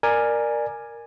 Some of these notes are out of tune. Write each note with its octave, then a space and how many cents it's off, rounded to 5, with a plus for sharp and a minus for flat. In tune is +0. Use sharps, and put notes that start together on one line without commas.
A#4 +0 D5 +20 G#5 +0